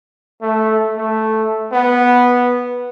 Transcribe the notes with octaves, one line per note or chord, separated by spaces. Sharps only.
A3
A3
B3